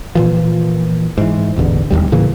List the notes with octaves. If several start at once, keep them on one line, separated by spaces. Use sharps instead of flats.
A#2 E3 F3
G#2 E3
E1 A1 E2 D3
E1 A#1 D#2 G3
A2 C#3 E3 A#3